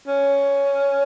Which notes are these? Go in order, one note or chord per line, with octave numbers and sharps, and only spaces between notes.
C#4